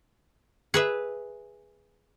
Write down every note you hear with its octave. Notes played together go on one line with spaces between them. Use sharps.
G#4 B4 E5